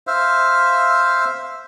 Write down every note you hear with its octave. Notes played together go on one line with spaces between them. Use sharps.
C5 E5 F5